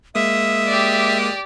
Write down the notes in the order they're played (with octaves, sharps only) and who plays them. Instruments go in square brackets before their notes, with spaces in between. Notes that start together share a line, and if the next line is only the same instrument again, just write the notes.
[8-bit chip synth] G#3 A#3 D#6 [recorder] E5
[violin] G4 D5